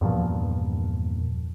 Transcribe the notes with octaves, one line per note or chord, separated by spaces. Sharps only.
E2 G2 A#2 F3